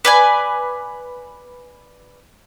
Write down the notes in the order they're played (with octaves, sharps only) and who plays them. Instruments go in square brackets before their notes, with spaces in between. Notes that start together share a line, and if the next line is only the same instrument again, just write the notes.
[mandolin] B4 D5 G#5